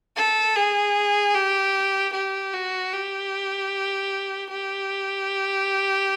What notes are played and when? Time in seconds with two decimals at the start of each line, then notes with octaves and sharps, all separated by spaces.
0.17 A4
0.56 G#4
1.35 G4
2.14 G4
2.54 F#4
2.93 G4
4.51 G4